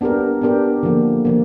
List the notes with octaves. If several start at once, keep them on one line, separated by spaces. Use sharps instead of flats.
B3 D4 G4 A#4
B3 D4 G4 A#4
D3 F3 A#3
D3 F3 A#3